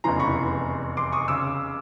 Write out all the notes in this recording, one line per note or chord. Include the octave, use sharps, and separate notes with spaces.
F1 E2 C#3 E3 A#5 C6
B5 C#6
C6 D6
C#6 D#6
C#3 D6 E6